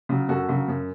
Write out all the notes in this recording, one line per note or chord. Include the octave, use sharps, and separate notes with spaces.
C#3 F#3
F#2 F#4 A4
C#3 F#3
F#2